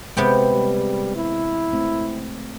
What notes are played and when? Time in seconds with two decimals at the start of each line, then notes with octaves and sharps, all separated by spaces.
0.17 C3 G#3 B3 B4 G5
0.54 G3
1.16 E4
1.73 A3 C4